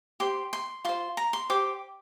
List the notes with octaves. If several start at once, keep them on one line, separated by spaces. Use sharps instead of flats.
G4 C5 C6
C6
F4 C5 C6
A#5
C6
G4 C5 D6